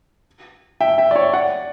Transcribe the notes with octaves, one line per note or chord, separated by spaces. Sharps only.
E5 G5
E5 G5
D5
C#5 E5
D5 F#5